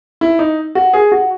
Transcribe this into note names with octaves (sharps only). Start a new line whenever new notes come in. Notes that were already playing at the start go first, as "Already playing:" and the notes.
E4
D#4
F#4
G#4
F#4